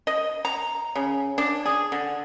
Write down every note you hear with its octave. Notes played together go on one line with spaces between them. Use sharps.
D#5
A#5
C#3
D4
G#4
D3